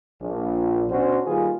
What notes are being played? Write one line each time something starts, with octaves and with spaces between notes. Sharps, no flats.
A#1
B2 C#4 D4 F#4 C5
D#3 G3 A#3 F4 G#4 B4